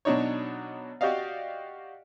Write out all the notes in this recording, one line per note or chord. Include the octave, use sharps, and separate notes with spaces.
B2 F#3 D4 D#4 C#5
F#4 G4 D5 D#5 F5